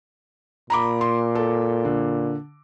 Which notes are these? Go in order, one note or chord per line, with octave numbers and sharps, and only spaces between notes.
A#2 A#5 B5 D6
C6
A4
D3